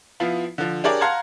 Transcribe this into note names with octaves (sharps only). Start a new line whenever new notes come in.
F3 B3 E4 F4
D3 F3
D4 G4 G#4 A#4 C#5 D5
F5 F#5 A5 A#5 C6 G#6